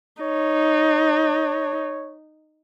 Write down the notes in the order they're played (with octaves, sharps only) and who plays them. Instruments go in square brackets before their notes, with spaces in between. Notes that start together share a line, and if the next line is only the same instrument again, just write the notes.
[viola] D#4 [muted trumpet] C#5